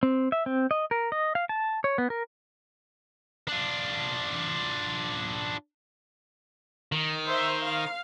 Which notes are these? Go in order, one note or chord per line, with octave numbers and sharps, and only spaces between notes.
C4
E5
C4
D#5
A#4
D#5
F5
A5
C#5
B3
A#4
D4 F4
D#3
C5 E5
F5